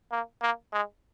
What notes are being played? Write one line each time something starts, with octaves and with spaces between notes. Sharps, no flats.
A#3
A#3
G#3